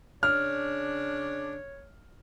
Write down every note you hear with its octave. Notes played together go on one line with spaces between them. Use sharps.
C#3 D4 C#5 F6